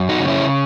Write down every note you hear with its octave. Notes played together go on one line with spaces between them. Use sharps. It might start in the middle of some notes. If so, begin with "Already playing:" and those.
Already playing: F#2
D#4 F#4
C#3
C#4 E4